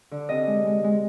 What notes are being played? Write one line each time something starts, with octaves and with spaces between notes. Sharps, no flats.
D3
C3 D#5
G#3
G#3
G#3